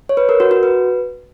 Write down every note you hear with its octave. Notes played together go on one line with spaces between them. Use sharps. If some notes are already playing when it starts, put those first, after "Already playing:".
C#5
B4
A#4
F#4
F#4
B4